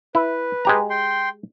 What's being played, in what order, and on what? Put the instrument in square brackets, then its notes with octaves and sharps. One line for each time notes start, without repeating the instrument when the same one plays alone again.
[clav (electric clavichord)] E4 [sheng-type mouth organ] B4
[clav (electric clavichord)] G#3 G4 A#5
[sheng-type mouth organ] G5 C6